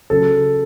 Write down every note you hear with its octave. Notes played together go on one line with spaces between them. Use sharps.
C#3 F#3 A4